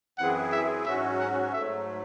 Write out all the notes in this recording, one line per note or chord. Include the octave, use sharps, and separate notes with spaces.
F#2 E3 C4 E4 G#4 F#5
E5
G#2 F#3 C#4 F#4 E5
F#5
G#2 F#3 A3 E5